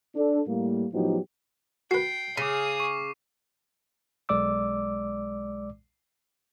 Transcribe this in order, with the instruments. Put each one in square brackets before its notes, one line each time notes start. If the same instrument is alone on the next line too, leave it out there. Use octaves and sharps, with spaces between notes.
[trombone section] D4 A4
A2 G3 A3 A#3
A2 F3 F#3 B3 D#4 G4
[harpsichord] F#4 B4 [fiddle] G5 [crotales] C7
[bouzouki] C#3 [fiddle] G#4 D#6 [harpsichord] B5 [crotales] D6 D#7
[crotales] C#6
[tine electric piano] B1 G#3 D5 D6 E6